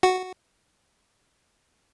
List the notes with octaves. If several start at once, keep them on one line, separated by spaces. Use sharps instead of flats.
F#4